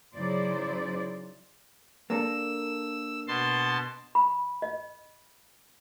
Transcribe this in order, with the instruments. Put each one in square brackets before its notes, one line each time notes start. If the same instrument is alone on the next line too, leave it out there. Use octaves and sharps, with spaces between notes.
[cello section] C#3 F#3 D#4 E4 C5 D5
[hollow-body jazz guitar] A#3 D4 A4 [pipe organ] E6
[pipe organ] B2 A5 C6
[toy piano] B5
D#5